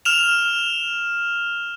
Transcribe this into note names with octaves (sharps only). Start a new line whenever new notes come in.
F6 E7 F7